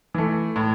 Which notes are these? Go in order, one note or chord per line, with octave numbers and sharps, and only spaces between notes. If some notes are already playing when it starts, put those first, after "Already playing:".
E3 A3
A2